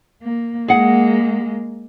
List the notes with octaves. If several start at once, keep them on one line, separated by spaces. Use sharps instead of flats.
A#3
G#3 A#3 G#4 F#5